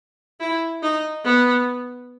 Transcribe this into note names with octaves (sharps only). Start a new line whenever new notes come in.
E4
D#4
B3